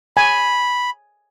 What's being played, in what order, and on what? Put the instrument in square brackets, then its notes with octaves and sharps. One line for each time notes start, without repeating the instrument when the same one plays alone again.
[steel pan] G#5 [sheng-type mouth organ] B5